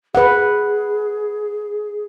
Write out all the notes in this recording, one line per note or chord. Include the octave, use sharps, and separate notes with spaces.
G#4 B4 F#5